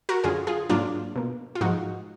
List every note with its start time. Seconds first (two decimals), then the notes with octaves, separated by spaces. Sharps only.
0.09 F#4 A#4
0.24 F#2 D3 F#3 F4 G#4
0.47 F4 G#4
0.70 G#2 F#3 A#3 D4 F4
1.16 B2 A#3
1.55 F4
1.61 G#2 F3 G#3 D#4 F#4